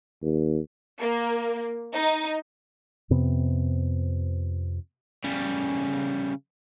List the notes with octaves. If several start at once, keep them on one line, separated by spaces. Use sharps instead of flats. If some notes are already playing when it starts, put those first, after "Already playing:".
D#2
A#3
D#4
F2 C3 B3
C#3 G3